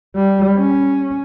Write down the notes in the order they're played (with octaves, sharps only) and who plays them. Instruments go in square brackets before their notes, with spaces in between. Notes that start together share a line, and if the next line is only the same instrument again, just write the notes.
[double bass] G3
C#4